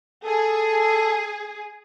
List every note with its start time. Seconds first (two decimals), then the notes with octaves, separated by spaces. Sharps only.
0.25 G#4 A4